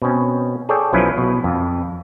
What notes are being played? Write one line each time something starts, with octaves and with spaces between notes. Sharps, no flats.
B2 C4 C#4
G#4 A4 C#5 D5 G5
B1 F3 F#3 C#4 E4 B4
B2
F2